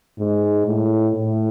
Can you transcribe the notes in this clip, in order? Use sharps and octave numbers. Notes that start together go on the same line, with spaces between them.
G#2
A2
A2